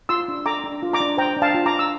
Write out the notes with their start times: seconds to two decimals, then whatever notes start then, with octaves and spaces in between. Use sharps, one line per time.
0.09 F4 C6 E6
0.28 D4
0.46 A4 A#5 D6
0.64 D4
0.83 F4
0.93 A#5 D6
1.00 D4
1.18 C5 G5 A#5
1.37 D4
1.42 F5 A5
1.54 F4
1.66 A#5 D6
1.73 D4
1.79 E6